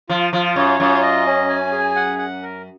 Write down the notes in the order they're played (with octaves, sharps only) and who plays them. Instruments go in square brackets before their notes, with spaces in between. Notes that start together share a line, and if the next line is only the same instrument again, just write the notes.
[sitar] F3 [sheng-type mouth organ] F4
[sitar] F3 [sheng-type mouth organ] F4
[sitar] F#2 [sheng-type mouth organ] C#5
[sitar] F#2 [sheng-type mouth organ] F4
[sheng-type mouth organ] D#5
C#4
G#5
G#4
F#5
F#5
A#4